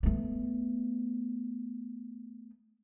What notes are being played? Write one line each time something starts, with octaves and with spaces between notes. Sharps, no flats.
A3 B3